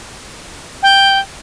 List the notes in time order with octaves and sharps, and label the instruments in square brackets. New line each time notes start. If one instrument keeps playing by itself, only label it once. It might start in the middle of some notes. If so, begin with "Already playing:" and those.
[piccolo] G5